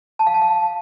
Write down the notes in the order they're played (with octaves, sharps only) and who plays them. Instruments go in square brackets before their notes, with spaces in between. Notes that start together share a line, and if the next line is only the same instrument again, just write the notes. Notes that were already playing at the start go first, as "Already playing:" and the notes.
[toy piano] A5
F5
A5
F5